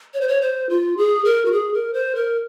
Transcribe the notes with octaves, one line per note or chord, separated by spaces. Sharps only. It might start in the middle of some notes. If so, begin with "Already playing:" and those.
C#5
C5
C#5
C5
F4
G#4
A#4
F#4
G#4
A#4
C5
A#4